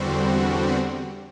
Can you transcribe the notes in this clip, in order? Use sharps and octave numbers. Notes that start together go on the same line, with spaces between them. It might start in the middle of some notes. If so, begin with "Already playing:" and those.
Already playing: E2 D3 G3 C4 F#4